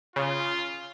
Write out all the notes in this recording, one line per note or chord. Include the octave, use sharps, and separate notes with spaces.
C#3 F4